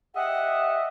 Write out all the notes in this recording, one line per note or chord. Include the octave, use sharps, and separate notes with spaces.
G4 D#5 E5 F#5